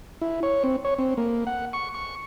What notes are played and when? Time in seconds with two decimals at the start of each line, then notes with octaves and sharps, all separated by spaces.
0.21 E4
0.43 C#5
0.64 C4
0.85 C#5
0.99 C4
1.17 A#3
1.47 F#5
1.73 C#6
1.94 C#6